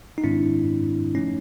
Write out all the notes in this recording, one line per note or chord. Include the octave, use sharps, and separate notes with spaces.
D#4
G#2 D#3 G#3 C4 D4 E4
F3 A3 C#4 D#4